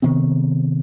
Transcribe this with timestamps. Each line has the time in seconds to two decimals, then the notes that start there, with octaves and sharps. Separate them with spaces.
0.02 C3 D#3 B3 C4